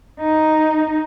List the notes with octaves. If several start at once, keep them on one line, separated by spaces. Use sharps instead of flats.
D#4